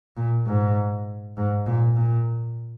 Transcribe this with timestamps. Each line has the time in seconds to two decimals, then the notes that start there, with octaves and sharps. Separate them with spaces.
0.17 A#2
0.47 G#2
1.37 G#2
1.66 A#2
1.97 A#2